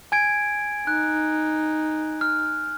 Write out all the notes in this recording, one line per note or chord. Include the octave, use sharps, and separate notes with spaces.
G#5 G#6 D7
D#4 F#6
F6